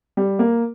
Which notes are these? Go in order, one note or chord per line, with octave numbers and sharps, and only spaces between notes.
G3
A#3